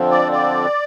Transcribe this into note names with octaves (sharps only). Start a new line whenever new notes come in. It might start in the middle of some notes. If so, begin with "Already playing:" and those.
Already playing: F2 D3 F3 C4
D5
D5